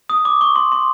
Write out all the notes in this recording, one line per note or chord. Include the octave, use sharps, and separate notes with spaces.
D#6
D6
C#6
C6
C6